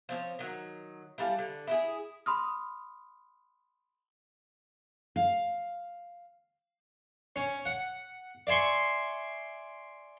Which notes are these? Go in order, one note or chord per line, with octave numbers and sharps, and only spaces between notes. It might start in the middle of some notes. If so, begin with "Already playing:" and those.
F3 C4 C#5
D#3 F#3
E3 G3 A4 F5
D3
E4 F#4 G#4
B5 C6 D#6 F6
F5
C#4
F#5
D5 E5 G#5 C6 C#6